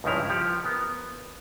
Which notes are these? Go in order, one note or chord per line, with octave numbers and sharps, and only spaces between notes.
C#2 G2 C#3 F3 E4 A#5
F3 G4 F#5
B3 A#4